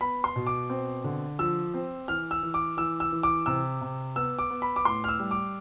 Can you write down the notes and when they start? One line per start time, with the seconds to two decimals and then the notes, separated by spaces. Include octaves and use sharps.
0.01 B3 B5
0.24 C6
0.36 B2
0.47 D6
0.70 C4
1.04 D3
1.39 F3 E6
1.74 C4
2.08 E3 F6
2.31 E6
2.43 E3
2.54 D6
2.77 E3 E6
3.00 E6
3.12 E3
3.23 D6
3.46 C3 E6
3.81 C3
4.16 B3 E6
4.39 D6
4.50 B3
4.62 B5
4.76 D6
4.85 A2 C6
5.04 F6
5.08 E6
5.19 G3
5.31 D6